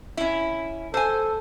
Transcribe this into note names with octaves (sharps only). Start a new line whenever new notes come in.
C#4 E4
A4 C5 G#5